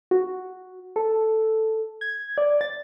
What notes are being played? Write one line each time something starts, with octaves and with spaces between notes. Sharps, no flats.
F#4
A4
G#6
D5
A6